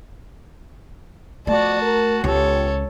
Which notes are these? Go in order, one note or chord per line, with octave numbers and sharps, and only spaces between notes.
B2 F3 A3 F#4 D5 A5
A#4
C#2 B3 F4 G4 A4 C#5